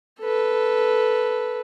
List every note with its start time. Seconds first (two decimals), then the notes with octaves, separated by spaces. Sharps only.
0.21 A4 B4